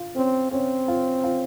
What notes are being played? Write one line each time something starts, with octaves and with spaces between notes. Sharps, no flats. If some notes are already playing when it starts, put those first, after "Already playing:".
Already playing: F4
C4 C#4
C4 C#4
F4
F4